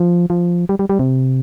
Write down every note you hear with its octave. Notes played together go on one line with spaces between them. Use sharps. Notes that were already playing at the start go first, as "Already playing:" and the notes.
Already playing: F3
F3
G3
G3
G3
C3